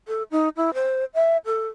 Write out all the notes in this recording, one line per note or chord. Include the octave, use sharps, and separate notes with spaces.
A4
D#4
E4
C5
E5
A4